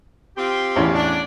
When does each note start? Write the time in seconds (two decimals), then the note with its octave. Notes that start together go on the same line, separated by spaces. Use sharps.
0.37 C4 F4 G4
0.76 A1 E2 C#4
0.94 D4